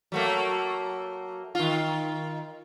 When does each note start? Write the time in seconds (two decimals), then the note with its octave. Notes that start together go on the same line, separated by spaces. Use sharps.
0.12 F#3 A3 A#3
1.55 D#3 F4